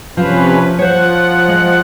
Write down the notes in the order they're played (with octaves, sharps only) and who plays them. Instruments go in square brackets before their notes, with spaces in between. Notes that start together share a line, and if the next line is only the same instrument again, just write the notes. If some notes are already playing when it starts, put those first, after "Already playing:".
[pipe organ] C3 C#4 B4 [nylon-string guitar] F3
[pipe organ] F3 F#5 [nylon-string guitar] C5 C#5
[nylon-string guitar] G#3